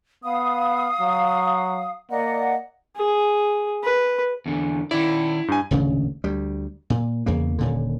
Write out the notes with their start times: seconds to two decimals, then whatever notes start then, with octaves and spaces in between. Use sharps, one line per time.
0.24 B3 F5 D#6
1.00 F#3
2.10 A#3 D5 D#5 F#5
2.96 G#4
3.84 B4
4.46 E2 D3
4.91 D#3 E4 D5
5.48 G2 G#5
5.71 D#1 G#1 D2 C#3
6.24 D2 G3
6.90 A#2
7.26 E2 C#3 A#3
7.58 D#1 A#2 D3